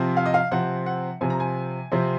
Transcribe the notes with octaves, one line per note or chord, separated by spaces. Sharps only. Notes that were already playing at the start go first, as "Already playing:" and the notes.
Already playing: C3 F3 C4
F5
D#5
F5
C3 F3 C4 F#5
F#5
C3 F3 C4 G#5
A#5
G#5
C3 F3 C4